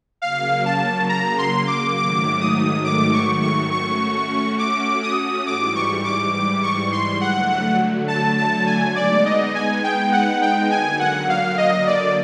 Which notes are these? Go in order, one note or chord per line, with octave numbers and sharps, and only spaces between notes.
C#3 F#3 A#3 F5
A5
A#5
C6
D6
G#2 D#3 F#3 A3 D6
D#6
D6
C#6
C#6
A3 C#4 F#4 C#6
D6
D#6
G#2 E3 G3 D6
C#6
D6
D6
C#6
C6
D3 F#3 A3 F#5
F#5
A5
A5
G#5
G#3 B3 D#4 D5
D#5
G#5
G5
F#5
G5
D3 F#3 A#3 G#5
F#5
F5
D#5
D5